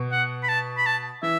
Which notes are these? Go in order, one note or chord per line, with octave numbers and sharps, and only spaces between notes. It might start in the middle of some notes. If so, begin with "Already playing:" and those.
Already playing: B2
F#5
B5
A5
B5
A5
E3 E5